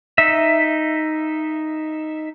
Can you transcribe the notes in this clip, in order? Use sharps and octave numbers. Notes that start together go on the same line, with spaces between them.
D#4 E5